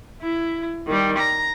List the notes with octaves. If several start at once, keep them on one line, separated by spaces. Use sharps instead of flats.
E4
D#3 G3
A#5